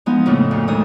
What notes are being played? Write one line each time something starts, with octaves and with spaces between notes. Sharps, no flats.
F3 G#3 B3 D#4
F2 A2 C#3 A3 A#3
D2
D2 D#3 G#3 A4 D#6